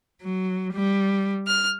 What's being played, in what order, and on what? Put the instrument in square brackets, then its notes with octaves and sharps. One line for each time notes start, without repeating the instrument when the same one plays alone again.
[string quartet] F#3
G3
F6